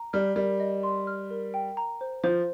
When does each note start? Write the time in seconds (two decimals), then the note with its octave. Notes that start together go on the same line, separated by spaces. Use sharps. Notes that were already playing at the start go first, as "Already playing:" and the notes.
Already playing: A#5
0.13 G3 F6
0.36 G3 A#4
0.60 D#5
0.83 C6
1.07 F6
1.30 A#4
1.54 G5
1.77 A#5
2.01 C5
2.24 F3 C5